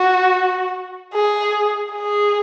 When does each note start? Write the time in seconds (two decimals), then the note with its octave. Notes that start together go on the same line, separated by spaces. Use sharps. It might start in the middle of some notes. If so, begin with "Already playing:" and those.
Already playing: F#4
1.14 G#4
1.92 G#4